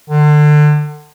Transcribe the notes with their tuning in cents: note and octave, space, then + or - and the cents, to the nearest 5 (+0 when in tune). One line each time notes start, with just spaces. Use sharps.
D3 +30